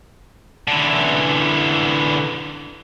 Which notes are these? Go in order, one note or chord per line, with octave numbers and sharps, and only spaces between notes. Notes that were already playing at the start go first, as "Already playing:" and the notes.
D3 E3